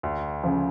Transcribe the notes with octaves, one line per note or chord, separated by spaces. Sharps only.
D2
C#3 F3